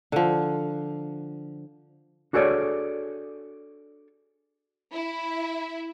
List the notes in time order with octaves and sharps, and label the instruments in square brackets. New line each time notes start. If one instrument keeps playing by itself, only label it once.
[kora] D3 F3
[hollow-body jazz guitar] D4 F#4 G#4 A4 C#5 D5
[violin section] E4